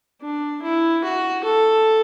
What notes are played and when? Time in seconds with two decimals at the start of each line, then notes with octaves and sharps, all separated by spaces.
0.22 D4
0.62 E4
1.04 F#4
1.44 A4